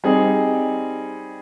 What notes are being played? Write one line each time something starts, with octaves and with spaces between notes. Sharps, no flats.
G3 C4 D#4 G#4